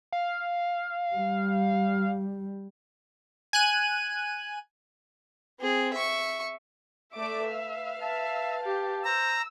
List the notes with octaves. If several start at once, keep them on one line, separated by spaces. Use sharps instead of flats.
F5
G3
G#5 F#6 D#7
C4 G#4
E5 C#6
A3 D5 E5 D6
B4 F5
E5 A5
G4
C5 A#5 E6